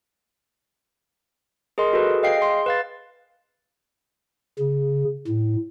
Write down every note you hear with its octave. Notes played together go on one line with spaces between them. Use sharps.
G#4 A#4 D#5 C6
F#4 G#4 A4 B4
D#5 F5 G5 C7
G#4 C6
B4 F5 A6
C#3
A2